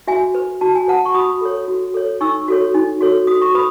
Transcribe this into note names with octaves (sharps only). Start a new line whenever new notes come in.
F#4 E5 G#5
B4
F#4 A5
G#5
B4 F#5 A5
C#6
F#4 B5 D#6
A4 C#5
F#4
A4 C#5
D#4 C#6 E6
F#4 A4 C#5
D#4
F#4 A4 C#5
F#4 D#6
C#6
B4 B5 D#6